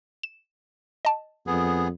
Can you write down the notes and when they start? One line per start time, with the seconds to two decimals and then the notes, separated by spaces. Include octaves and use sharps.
0.23 E7
1.05 D#5 A5
1.47 F2 B3 G#4